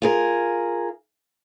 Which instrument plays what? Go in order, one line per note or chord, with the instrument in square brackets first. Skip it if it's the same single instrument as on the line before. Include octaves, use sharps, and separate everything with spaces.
[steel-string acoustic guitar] F4 G#4 A#4